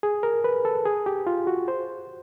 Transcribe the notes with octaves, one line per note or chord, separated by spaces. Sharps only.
G#4
A#4
B4
A4
G#4
G4
F4
F#4
C5